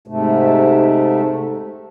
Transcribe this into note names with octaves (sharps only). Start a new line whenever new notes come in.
G#2 C3 A3